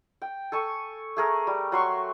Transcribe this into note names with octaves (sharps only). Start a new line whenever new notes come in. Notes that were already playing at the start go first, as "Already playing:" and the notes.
G5
A4 G#5 C#6
A3 G#4 A#4
G3
F#3 C6 C#6